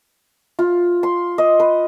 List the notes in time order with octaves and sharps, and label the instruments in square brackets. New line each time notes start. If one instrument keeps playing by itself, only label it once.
[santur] F4
C6
D#5
B4